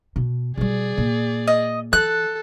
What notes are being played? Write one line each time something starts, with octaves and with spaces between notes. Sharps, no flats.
B2
B2 G3 G#4 D5
A#2
D#5
E3 A4 F#6